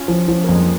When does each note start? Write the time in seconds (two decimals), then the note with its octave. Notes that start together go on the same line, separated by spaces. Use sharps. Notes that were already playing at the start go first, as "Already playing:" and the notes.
Already playing: C#4 F4
0.08 F3
0.28 F3
0.35 C#4
0.44 A#3
0.49 F2 G#3
0.60 F3